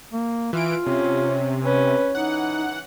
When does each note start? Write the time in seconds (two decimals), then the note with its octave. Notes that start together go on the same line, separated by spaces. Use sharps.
0.12 A#3
0.53 E3 F4 D7
0.86 C3 C#4
1.64 C#4 B4
2.15 E3 D#4 F#5